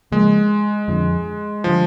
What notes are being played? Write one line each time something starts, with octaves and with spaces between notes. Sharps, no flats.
C#3 F3 G#3 A#3
F2 D3 F3
D3 F3 G3